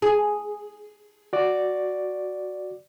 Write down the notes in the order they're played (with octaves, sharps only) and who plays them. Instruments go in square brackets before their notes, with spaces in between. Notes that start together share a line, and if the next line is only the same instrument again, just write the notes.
[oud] G#4
[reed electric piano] F#4 D5